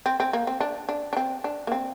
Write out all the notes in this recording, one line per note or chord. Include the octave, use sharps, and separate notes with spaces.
C4
C4
A#3
C4
D4
D4
D4
C4
D4
A#3
C4